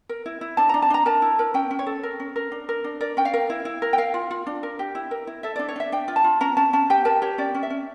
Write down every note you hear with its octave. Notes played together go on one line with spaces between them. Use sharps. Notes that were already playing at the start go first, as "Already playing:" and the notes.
A#4
E4
E4
D4 A5
D4 A#5
A5
D4 A#5
A#4 A5
E4
A#4
C#4 G5
C#4
C#5
A4
A#4
C#4
A#4
D4
A#4
D4
A#4 D5
C#4 G5
F5
A#4
E4
E4
A#4
G5
A#4 F5
F4
F4
D4
A#4
G4
E4
A#4
E4
A4 E5
D4 D5
C#5
D4 E5
D4 G5
F4
A5
F4
C#4 A#5
C#4 A5
C#4 A5
G4 G5
A#4 A5
G4 C#5
C#4 D5
C#4
E5
C#4